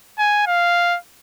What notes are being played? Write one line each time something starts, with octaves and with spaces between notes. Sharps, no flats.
G#5
F5